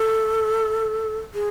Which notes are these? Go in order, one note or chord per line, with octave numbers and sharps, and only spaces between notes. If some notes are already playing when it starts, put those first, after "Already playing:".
Already playing: A4
G#4